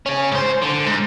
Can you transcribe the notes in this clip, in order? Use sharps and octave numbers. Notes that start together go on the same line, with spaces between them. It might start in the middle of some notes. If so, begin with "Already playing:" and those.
C#4 G#4
G#2 C5
D3
G#2